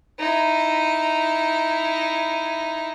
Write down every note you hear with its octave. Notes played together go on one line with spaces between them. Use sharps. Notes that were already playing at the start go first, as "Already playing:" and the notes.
D#4 E4